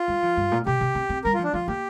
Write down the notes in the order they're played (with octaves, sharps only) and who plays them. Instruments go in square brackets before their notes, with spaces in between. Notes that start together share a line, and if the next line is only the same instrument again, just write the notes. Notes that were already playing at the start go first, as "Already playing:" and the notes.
Already playing: [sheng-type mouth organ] F4
[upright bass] G3
F3
G2
A#2
[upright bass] C3 [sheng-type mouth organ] G4
[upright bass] C3
C4
C4
[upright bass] G3 [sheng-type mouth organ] A#4
[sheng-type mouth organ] F4
[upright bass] F3
[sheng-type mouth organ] D4
[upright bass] F3 [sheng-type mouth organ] F4
[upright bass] A#3 [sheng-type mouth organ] G4